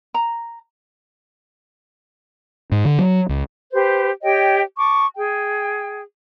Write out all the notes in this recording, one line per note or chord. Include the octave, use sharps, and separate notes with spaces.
A#5
G#2
D3
F#3
C#2
G4 B4 C5
G4 C#5 D#5 G5
A5 C#6 D6
G#4 G5